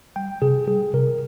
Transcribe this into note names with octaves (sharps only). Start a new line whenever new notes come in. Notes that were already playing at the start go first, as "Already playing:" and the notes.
G3 G5
C3 G#4
G3 G#4
C3 A#4